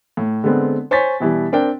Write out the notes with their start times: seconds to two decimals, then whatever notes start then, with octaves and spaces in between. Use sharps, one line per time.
0.17 A2
0.44 D3 G#3 B3 C4
0.91 C5 C#5 G#5 C#6 A6 B6
1.20 B2 E3 G3
1.52 C4 D4 A#4 G5